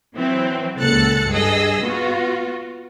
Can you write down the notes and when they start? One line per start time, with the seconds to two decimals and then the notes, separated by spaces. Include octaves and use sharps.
0.16 E3 F#3 C4
0.79 C#2 A#2 A4 F#6 A6 C#7
1.29 G2 G#4 A4 D#5 E6
1.84 B3 F4 F#4